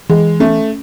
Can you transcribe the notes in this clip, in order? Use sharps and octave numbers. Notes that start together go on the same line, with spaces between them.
E3 G#3
A3 C#4